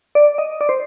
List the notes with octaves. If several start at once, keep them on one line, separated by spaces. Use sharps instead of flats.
D5
D#5
D5
C5